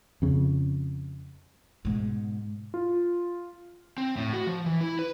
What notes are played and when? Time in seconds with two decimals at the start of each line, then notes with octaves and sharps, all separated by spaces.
0.22 F2 C#3
1.85 G#2 B2
2.74 F4
3.98 C4
4.17 A2
4.33 F#4
4.47 F3
4.66 E3
4.81 E4
4.99 B4